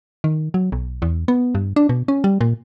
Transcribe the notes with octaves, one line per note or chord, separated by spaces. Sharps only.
D#3
F#3
B1
E2
B3
G2
D4
B2
C#4
G3
A#2